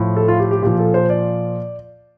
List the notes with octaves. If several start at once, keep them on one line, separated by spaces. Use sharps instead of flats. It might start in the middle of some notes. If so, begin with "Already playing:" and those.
Already playing: A2 F3
A4
F4
G4
G4
A#2 F3 G4
A4
C5
D5